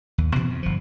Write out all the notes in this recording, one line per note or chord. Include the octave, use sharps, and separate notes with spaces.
D#2
B2 E3 B3 C4
F2
G1 F3